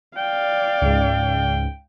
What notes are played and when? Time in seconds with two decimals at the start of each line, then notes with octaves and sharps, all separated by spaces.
0.17 D5 F5 G5
0.82 C#2 G#2